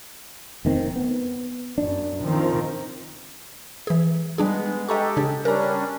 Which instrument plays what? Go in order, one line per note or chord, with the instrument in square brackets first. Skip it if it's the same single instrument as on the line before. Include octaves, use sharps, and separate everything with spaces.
[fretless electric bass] F1 D#3 C4
B3
[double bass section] F#2 [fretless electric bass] D4
[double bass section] D#3 F3 C4
[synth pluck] E3 G#4
[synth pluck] G3 D4 G#4 [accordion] G#3 B3
[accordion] G#3 G4 A4 [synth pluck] D#5 A#5 C#6
[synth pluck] C#3 D4 G#4
[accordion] G3 C#4 D4 [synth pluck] A#4 A#5